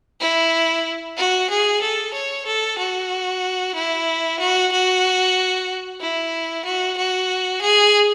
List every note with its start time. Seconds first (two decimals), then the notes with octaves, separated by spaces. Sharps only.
0.20 E4
1.17 F#4
1.50 G#4
1.81 A4
2.13 C#5
2.46 A4
2.78 F#4
3.75 E4
4.39 F#4
4.72 F#4
6.00 E4
6.65 F#4
6.97 F#4
7.61 G#4